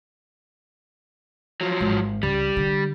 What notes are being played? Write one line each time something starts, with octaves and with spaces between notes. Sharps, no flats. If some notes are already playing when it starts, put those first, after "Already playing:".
F3 F#3
G#1
C#2 G3
D3